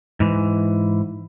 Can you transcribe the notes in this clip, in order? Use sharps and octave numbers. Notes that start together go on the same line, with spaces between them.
G#2 E3